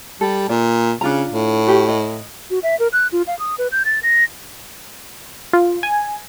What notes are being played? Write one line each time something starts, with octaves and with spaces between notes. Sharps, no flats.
G3 A4
A#2 D5
C#3 D4 F4 A#5
A2
F#4 G4 G5
D#5
F#4
E5
A#4
F#6
F4
F5
D#6
B4
G6
A6
A#6
F4
G#5